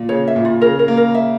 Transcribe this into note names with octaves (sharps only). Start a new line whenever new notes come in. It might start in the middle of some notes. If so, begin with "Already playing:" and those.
Already playing: A#2
C#3 C#5
E5
A#2
F4
C#3 A#4
A#4
A#3
A#4
E5